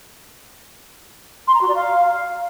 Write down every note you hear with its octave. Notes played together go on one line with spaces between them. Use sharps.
C6
A#5
F#4
D5
F5